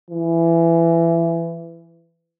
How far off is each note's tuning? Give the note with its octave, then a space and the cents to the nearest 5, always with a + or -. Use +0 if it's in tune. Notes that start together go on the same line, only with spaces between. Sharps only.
E3 +20